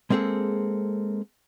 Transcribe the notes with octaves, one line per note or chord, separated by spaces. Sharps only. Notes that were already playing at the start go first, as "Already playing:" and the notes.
G#3 A#3 C4 G#4 A4